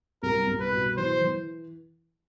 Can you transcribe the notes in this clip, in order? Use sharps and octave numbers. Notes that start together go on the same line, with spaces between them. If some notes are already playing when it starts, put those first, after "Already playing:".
C2 A#4
C2
B4
B2
E3 C5
E3